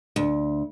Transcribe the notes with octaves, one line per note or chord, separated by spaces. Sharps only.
D2